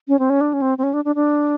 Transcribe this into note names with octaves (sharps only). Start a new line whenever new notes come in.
C#4
C4
C#4
D4
C#4
C4
C4
C#4
D4
D4
D4